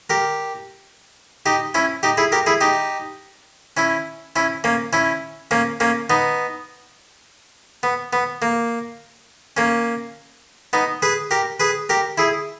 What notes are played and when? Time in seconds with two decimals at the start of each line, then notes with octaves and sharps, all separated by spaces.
0.10 G4 A#4
1.46 D#4 G4
1.74 C#4 E4
2.03 D#4 G4
2.17 E4 G#4
2.32 G4 A#4
2.46 E4 G#4
2.61 D#4 G4
3.77 C#4 E4
4.36 C#4 E4
4.64 A#3 C#4
4.93 C#4 E4
5.51 A#3 C#4
5.80 A#3 C#4
6.10 B3 D#4
7.83 B3
8.13 B3
8.42 A#3
9.57 A#3 C#4
10.73 B3 D#4
11.02 G#4 B4
11.31 G4 A#4
11.60 G#4 B4
11.89 G4 A#4
12.18 E4 G#4